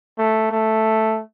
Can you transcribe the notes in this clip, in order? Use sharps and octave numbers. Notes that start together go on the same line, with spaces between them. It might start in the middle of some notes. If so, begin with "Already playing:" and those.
A3
A3